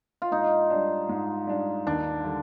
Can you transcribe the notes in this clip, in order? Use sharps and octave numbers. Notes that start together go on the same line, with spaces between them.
F4
G#2 D#4
G3 D4
G#2
G3 D4
D#2 D4
D3 G3